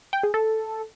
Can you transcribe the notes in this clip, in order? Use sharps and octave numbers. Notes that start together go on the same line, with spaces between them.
G5
G#4
A4